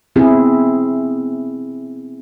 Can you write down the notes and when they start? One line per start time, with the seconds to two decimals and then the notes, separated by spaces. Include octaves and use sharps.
0.16 B2 C4 E4 G#4